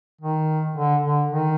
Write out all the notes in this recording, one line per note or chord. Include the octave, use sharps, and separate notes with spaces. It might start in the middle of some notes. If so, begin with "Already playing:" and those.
D#3
D3
D3
D#3